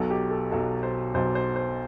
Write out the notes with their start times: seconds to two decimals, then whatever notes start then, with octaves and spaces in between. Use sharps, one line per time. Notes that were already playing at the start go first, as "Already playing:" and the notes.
Already playing: B1 B2 F#3 A4
0.10 G4
0.31 A4
0.51 B1 B2 F#3 A4
0.83 C5
1.14 B1 B2 F#3 C5
1.35 C5
1.56 C5